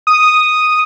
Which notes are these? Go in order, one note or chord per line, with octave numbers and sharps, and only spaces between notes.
D#6